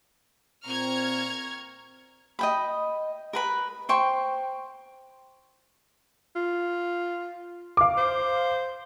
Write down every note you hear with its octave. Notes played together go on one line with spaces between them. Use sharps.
A#2 C4 A#5 C#6 F6 G#6
D#5 G5 B5
A#4 B4 B5
C5 G5 C6 C#6
F4
F5 D6
C5